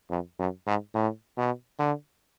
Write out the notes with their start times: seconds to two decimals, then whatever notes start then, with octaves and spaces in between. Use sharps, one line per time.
0.10 F2
0.39 F#2
0.67 G#2
0.95 A2
1.38 B2
1.79 D3